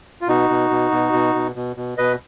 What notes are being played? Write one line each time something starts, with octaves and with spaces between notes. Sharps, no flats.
F4
B2 D#4 F#4
B2
B2
B2
B2
B2
B2
B2
B2 B4 D#5